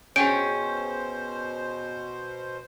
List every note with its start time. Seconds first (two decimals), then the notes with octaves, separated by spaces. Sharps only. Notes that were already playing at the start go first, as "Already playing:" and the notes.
0.16 B2 C#4 G#4 C5 G5 G6 D7